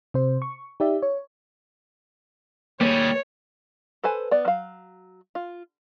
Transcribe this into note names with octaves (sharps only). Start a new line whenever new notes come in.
C3 C5
C#6
D#4 G4 D5 E5
C#5
D#2 G3 A#3 G#4 C#5
A4 B4 C5 G#5
B3 D5
F#3 F5
F4